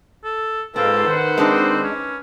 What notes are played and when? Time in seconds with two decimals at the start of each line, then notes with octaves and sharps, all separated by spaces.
0.24 A4
0.76 G#2 A#3 C4 F4 A4 B4
1.06 D#3 C5 F#5
1.38 G#3 C4 D4 D#4
1.84 C#4